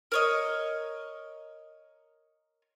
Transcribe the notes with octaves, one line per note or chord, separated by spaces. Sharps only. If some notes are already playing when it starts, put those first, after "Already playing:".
A#4 C#5 D#5